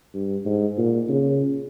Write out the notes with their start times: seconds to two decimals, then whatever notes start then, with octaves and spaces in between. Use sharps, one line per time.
0.14 G2
0.46 G#2
0.78 A#2
1.09 C#3